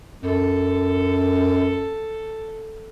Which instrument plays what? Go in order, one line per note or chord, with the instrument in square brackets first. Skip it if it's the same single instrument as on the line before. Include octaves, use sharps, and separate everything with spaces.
[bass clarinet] F#2 [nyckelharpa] A4